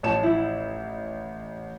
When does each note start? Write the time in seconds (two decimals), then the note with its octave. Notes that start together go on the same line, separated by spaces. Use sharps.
0.03 A1 F3 C#5 A5 E7
0.23 E4